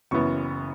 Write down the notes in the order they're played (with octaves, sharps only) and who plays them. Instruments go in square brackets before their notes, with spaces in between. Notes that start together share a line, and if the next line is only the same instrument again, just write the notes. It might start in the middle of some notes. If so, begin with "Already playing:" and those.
[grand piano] F#1 F#2 E3 B3 E4 C#6